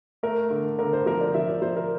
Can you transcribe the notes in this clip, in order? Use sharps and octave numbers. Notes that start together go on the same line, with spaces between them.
A3 A#4
D3
D3 A#4
C5
F3 A#4
D5
F3 E5
D5
F3 C5
A#4